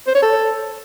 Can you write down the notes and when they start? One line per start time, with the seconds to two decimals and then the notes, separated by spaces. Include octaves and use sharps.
0.07 C5
0.15 C#5
0.22 A4